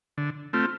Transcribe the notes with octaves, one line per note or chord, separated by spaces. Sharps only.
D3
A3 C4 F4